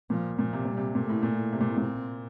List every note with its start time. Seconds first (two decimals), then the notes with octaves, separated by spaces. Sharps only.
0.10 A#2 F3
0.39 A#2 F3
0.53 C3
0.65 A#2 G3
0.77 C3
0.95 A#2 A3
1.09 A2
1.23 A#2
1.36 A2
1.53 C3
1.61 A#2
1.69 A2
1.77 A#2 C4